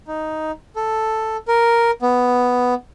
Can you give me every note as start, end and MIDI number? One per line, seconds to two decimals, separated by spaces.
0.08 0.51 63
0.76 1.37 69
1.48 1.91 70
2.02 2.74 59